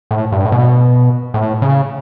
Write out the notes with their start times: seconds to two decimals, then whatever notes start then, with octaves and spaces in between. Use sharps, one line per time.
0.11 A2
0.32 G2
0.45 A2
0.52 B2
1.34 A2
1.62 C#3